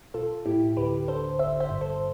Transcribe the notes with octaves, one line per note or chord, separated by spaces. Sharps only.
B1 F4 A4
A2 E4 G4
D2 G4 B4
D3 A4 C5
G1 C5 E5
C5 E5
G2
A4 C5